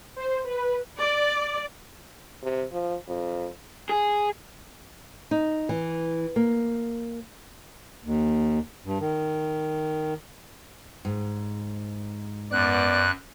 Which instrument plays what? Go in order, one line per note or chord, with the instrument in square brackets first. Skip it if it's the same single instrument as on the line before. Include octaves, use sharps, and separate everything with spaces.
[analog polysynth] C5
B4
[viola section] D5
[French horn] C3
F3
F2
[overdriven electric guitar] G#4
[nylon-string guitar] D#4
E3
A#3
[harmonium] D#2
G2
D#3
[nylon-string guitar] G#2
[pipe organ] F#2 F#6 [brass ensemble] B3 D5